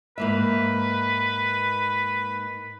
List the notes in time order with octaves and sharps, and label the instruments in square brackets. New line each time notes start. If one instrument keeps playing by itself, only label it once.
[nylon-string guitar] G#2 A#3 E5 [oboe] B4